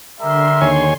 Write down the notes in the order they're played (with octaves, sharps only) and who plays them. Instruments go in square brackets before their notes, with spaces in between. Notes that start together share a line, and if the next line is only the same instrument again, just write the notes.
[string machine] D3 C6 [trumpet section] G3 A#4 E5
[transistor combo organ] D#2 C#5 G#5